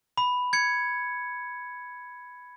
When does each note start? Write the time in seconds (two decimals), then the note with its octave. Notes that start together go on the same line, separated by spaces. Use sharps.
0.18 B5
0.53 G#6 C#7